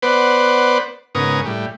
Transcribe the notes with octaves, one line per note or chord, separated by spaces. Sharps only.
B3 B4 C5 D5 F#5
G#2 C#3 B3 A#4 C#6 D#6
A2 G3